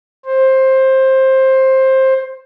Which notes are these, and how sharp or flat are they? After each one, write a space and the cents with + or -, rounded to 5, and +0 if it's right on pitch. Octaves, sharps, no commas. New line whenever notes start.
C5 +15